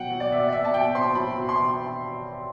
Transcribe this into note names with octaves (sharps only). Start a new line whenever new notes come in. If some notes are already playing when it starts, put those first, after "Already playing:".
Already playing: B2 F#3 F#5 G5
F#3
D5
B2 E5
D5
B2 E5
A5
B2 G5
C4 C6
F#3 B5
B2
C6